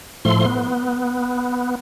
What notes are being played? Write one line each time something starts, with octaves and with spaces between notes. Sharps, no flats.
A2 F3 A3 C6
B3